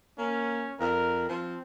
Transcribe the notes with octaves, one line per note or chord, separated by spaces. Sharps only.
A#3 C#4
F2 A#4
F3 C4